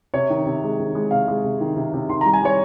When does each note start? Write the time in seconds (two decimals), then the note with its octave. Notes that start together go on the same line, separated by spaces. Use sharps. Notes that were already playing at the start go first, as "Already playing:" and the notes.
0.14 C3 C#5
0.30 D#3
0.46 C3
0.63 G#3
0.79 D#3
0.95 G#3
1.11 C3 F5
1.28 G#3
1.44 C3
1.61 D#3
1.76 C3
1.93 C3
2.09 D#3 C6
2.21 A#5
2.25 G3
2.33 G#5
2.42 G3 C#5